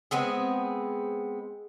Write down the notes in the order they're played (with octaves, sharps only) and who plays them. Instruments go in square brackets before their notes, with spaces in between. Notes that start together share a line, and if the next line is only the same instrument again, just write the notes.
[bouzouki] G#3 B3 C4 G#4